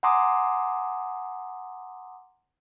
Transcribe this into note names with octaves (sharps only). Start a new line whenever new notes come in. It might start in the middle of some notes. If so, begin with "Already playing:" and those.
F#5 G#5 A#5 C6 D6 D#6